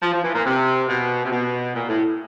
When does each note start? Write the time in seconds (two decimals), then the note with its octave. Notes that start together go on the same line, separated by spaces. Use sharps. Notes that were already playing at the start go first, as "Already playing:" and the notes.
0.03 F3
0.14 F3
0.24 E3
0.35 A#2
0.46 C3
0.89 B2
1.25 C3
1.32 B2
1.75 A#2
1.89 A2